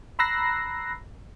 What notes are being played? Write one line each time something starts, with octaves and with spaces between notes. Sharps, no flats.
A#5 B5 E6 F#6 A#6 C7